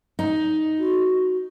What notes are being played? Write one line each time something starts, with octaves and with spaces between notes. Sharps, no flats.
D#4
F#4